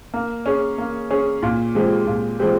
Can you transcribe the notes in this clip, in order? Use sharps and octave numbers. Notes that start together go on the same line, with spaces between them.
A#3
C#4 G#4 C#5
A#3
C#4 G#4 C#5
A#2
F3 G#3 C4 G4
A#2
F3 G#3 C4 G4